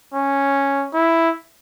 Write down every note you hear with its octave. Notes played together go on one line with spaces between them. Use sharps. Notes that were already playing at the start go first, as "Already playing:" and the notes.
C#4
E4